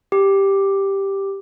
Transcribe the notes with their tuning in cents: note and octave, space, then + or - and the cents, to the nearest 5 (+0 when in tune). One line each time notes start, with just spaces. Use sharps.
G4 +0